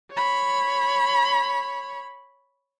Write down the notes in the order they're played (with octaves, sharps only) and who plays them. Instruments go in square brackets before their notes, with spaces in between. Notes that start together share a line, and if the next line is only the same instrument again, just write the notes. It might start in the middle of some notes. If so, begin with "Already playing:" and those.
[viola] C#5 B5